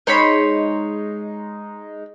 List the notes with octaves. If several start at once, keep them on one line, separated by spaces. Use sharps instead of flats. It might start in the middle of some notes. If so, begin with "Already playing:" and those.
G#3 D#4 C5 C#5 B5